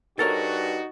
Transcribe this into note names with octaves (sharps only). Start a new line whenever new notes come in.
G2 D#4 F#4 A4 A#4 C#5 A6